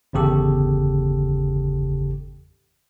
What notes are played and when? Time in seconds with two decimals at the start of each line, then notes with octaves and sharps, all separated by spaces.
0.13 G1 E2 C#3 G4 A4